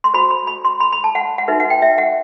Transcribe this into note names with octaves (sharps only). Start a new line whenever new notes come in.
C6
F#4 C5 B5
B5
B5
C6
B5
B5
A5
F#5
F#5
D#4 F#4 B4 E5
F#5
G5
E5
F#5